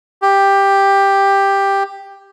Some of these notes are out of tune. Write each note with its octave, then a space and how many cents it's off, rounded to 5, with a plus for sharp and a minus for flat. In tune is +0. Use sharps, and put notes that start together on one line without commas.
G4 +10